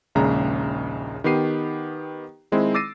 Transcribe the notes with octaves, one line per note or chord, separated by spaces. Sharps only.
A#1 D#2 C#3 G#3 A#5
D#3 B3 G4 C7 D#7
D#3 G#3 C4 D#4 E4
D6 E6 A6 A#6 C7 D#7